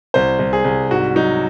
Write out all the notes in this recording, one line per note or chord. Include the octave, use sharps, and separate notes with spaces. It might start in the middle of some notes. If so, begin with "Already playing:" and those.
C2 C5
C2
G#4
C2
G#2 F#4
F#3 D#4